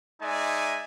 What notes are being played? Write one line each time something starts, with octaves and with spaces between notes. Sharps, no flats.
G#3 D#4 D5 E5 G#5